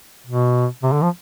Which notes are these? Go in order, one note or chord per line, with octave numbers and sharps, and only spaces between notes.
B2
C3
D3
F3